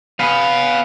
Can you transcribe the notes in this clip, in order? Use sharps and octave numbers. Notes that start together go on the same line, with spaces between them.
B3 B4 F5 G#5